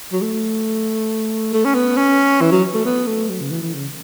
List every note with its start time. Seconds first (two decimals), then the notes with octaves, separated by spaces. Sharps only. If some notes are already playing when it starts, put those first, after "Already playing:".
0.13 F#3
0.22 A3
1.53 A3
1.65 C#4
1.75 B3
1.97 C#4
2.41 E3
2.52 F#3
2.74 A3
2.85 B3
3.07 A3
3.30 F#3
3.40 C#3
3.51 E3
3.62 E3
3.74 C#3